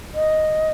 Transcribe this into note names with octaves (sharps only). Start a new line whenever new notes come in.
D#5